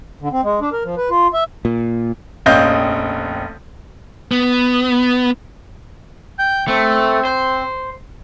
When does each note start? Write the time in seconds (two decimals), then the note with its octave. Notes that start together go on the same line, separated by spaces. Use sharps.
0.21 D3
0.32 C4
0.44 G#3
0.61 D4
0.73 A#4
0.84 F3
0.97 B4
1.10 F4
1.33 E5
1.65 A#2
2.46 F1 A#1 C#4 D#5 F5 G6
4.31 B3
6.39 G5 G6
6.68 A3 C4
7.25 C5